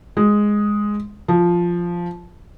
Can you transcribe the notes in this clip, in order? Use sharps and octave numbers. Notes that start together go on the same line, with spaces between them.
G#3
F3